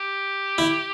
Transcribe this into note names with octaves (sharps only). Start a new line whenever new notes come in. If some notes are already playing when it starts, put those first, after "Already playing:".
Already playing: G4
E4